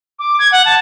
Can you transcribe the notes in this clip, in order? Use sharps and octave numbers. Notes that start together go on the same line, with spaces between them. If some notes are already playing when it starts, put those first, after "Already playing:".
D6
G#6
F#5
A5